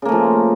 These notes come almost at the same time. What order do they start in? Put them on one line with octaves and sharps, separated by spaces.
C#3 A#3 A3 F3